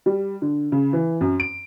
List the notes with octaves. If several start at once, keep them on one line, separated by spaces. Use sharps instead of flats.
G3
D3
C#3
E3
F#2
D7